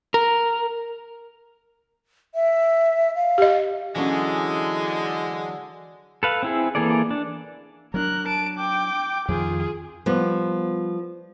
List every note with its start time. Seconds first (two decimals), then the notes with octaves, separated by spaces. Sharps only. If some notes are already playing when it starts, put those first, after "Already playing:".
0.14 A#4
2.35 E5
3.15 F5
3.38 G4 D#5
3.95 D3 E3 F#3 G#3 C#4
6.23 A4 B4 F5
6.43 C4 E4 G#4
6.75 E3 A#3 G#4 A4 D5
7.11 D4
7.94 F#3 C#4 D4 A#4 F#6
8.27 A5 D7
8.59 G5 D6
9.28 F2 D#3 F4 G#4
10.06 F3 G3 B3